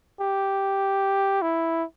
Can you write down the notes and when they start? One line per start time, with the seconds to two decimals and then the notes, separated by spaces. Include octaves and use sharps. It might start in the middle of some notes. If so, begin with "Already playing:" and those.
0.21 G4
1.42 E4